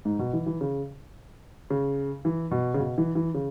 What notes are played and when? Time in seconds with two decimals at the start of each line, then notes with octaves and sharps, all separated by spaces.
0.05 G#2
0.19 B2
0.33 E3
0.46 E3
0.61 C#3
1.70 C#3
2.25 E3
2.51 B2
2.74 C#3
2.79 B2
2.98 E3
3.15 E3
3.34 C#3